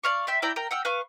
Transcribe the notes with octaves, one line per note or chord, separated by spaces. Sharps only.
D5 F5 C#6
E5 G5 C6
E4 D5 G5 A#5
A#4 G5
F#5 G5 E6 F6
B4 F5 C#6